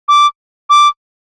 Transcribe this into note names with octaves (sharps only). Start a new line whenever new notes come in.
D6
D6